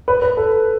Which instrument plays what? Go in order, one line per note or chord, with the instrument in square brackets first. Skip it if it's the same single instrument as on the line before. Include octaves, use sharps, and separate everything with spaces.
[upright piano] B4
B4
A4